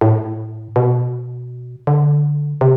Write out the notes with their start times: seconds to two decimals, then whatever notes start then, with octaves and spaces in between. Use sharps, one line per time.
0.01 A2
0.76 B2
1.87 D3
2.61 C3